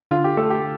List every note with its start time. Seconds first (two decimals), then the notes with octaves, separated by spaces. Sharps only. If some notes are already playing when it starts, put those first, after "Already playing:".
0.11 D3 F4
0.24 G4
0.37 A3 A4
0.50 G4